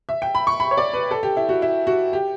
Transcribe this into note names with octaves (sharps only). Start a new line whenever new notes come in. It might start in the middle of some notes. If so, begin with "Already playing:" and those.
E5
G5
B5
C#6
B5
C#5
D5
B4
A4
G4
E4
F#4
E4
F#4
G4